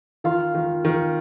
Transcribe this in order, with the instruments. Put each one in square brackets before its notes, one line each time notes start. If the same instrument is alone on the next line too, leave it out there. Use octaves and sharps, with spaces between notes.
[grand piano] D#3 [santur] F4 F5
[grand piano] D#3
D#3